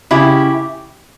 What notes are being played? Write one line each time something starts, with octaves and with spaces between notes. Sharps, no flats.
C#3 E4 G4